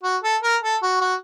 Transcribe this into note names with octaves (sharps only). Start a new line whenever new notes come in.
F#4
A4
A#4
A4
F#4
F#4